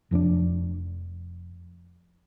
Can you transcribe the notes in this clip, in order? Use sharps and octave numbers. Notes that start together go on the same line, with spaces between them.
F1 F2 C#4 D4